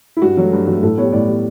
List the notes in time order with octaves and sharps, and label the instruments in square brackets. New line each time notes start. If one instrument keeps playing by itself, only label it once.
[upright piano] E4
G2 F#4
F#3 A3
G2
F#3 A3
A2 A4
G3 B3 C#5
A2 D5
G3 B3